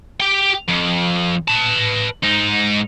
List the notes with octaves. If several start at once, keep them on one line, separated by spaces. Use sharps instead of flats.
G4 G5
F2
B4 A5
G#2 D#4